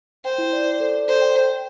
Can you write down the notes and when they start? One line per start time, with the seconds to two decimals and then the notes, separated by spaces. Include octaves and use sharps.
0.25 C5 G5
0.38 E4
0.53 D5
0.67 D5
0.80 A4
0.95 D5
1.08 A4 C5
1.22 G5
1.35 G5
1.49 G5